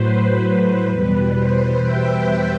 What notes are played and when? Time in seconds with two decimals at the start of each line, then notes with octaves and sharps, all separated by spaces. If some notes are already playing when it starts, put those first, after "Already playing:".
Already playing: A2 F#3 B4 C5
0.40 C5
0.88 E2 B2 G3 B4
1.36 C5
1.83 E5 G5